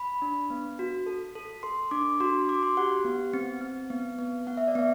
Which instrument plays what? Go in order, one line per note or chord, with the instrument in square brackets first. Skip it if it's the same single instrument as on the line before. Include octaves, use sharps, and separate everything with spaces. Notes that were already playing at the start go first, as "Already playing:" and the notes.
Already playing: [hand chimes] B5
D4
B3
F#4
A4
A4
A4 C6
D4 D6
F#4 C6
C6
F#4 D6
C6
G4 F#5
B3
C4
C4
B3
B3
B3 F#5
E5
D5
B3 E5